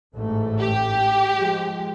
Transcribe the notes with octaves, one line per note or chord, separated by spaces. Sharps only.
A1 G#2 A3
G4
F3 G#3